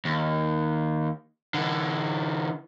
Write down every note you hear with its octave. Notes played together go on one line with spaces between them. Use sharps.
D#2
D3 E3